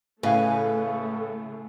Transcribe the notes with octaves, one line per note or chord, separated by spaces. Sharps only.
A2 C#3 A3 B4 F5 G#5